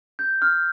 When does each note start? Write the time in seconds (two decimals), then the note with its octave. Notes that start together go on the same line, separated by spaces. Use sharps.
0.19 G6
0.42 F6